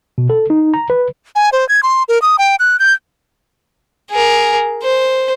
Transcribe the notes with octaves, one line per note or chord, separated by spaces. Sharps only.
B2
A4
D#4
A#5
B4
G#5
C5
G#6
C6
A#4
D#6
G5
F#6
G6
G#4 A#4
C5